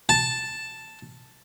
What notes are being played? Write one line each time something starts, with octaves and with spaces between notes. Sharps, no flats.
A5